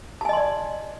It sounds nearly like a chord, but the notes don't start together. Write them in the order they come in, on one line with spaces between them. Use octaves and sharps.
A5 G#5 D#5 C6 D5